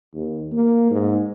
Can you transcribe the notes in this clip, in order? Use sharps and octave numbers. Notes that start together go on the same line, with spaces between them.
D#2
A#3
G#2